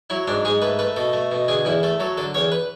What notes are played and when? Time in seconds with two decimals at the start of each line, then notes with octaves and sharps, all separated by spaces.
0.10 F#3 E4
0.28 G#2 D4
0.45 G#2 G#4
0.62 A3 B4
0.79 A3 B4
0.96 B2 A4
1.13 A3
1.32 B2
1.48 D3 G#4
1.65 E2 E4
1.83 A3 A4
2.00 F#3 A4
2.17 D3 A4
2.34 E2 C#5
2.52 B4